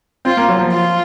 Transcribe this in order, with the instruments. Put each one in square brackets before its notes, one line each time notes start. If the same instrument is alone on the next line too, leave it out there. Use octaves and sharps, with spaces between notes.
[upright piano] C4 [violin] F4
[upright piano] A#3
F#3
F3
[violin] F4